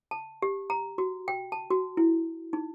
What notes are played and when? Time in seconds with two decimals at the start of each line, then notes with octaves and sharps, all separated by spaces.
0.11 A5
0.42 G4
0.70 A#5
0.98 F#4
1.28 G5
1.52 A5
1.70 F#4
1.97 E4
2.53 D#4